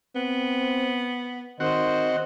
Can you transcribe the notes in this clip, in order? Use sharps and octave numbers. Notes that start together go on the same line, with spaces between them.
B3 C4
D#3 C4 F#4 C5 D#5 F#5